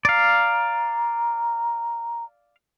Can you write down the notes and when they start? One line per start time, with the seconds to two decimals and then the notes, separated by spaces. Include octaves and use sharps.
0.05 D5 F5 A#5